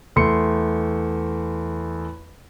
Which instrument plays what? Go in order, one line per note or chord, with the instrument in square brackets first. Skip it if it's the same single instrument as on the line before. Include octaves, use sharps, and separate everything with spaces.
[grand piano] E2 A3 C6 C#7